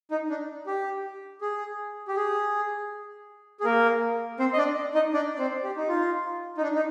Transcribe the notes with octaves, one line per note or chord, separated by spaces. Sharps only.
D#4
D4
G4
G#4
G4
G#4
G#4
A#3 A#4
C4 C5
D#5
D4 D5
D#4 D#5
D4 D5
D5
C4 C5
G4
D#4
F4
D#4
D4
D#4